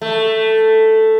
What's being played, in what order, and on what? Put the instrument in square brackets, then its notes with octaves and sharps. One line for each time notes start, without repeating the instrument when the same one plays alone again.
[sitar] A3